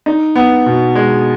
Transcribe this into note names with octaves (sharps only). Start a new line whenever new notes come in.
D#4
B3
B2
G#3